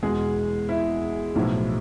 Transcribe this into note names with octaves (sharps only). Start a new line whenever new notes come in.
E2 B2 G#3 G#4
E4
B1 A2 F3